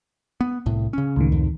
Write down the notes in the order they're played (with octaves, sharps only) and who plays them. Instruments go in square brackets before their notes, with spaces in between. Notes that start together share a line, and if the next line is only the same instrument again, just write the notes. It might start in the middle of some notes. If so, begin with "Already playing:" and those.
[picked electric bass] B3
C2 A2
C#3 C#4
[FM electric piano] C#2 A2 D#3
[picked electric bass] F2